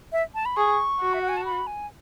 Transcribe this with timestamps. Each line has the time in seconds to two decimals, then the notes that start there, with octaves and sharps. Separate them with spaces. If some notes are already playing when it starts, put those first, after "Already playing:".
0.12 E5
0.35 A5
0.45 B5
0.56 G#4 C#6
1.01 F#4
1.14 E5
1.21 F#5
1.29 G#5
1.37 A5
1.45 B5
1.67 G#5